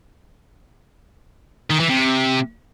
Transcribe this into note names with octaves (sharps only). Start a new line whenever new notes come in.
D#3
E3
C3